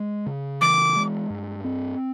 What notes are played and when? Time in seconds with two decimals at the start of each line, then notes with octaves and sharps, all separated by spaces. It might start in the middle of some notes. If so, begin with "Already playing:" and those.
Already playing: G#3
0.26 C#3
0.61 E3 D6
0.96 G#3
1.30 G2
1.64 C4